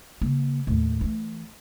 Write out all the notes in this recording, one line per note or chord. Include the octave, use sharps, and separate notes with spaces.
C#3 A#3
D#2 A2
E3 A3